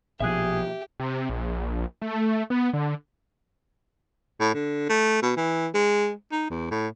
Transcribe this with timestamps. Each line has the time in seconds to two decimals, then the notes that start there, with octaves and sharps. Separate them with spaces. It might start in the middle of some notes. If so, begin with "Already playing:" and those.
0.20 A#1 B2 F3 G4 G#4 E5 F#6
1.00 C3
1.30 A#1
2.02 A3
2.50 B3
2.73 D3
4.40 A2
4.54 D3
4.89 A3
5.22 B2
5.37 E3
5.74 G#3
6.32 D#4
6.50 E2
6.71 A2